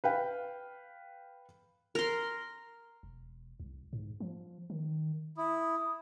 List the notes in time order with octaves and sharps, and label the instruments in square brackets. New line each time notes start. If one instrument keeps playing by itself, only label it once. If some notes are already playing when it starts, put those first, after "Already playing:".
[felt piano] B4 F5 G5
[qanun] A#4 C6
[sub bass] E1
C2
G#2
F3
D#3
[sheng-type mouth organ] E4 [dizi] D#6